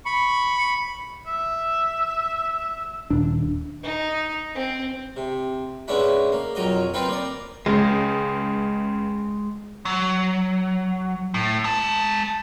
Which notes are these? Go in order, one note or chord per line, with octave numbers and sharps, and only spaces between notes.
B5 C#6
E5
D#1 D4
D#4
C4
C3
G#2 B3 C#4 D4 E4
A#3
B1 F2 F#3 A#4 D#5
B3 C4 D#4 F4 B4
A#3 D5
C#2 C#3 G#3
F#3
A2
G#3 A5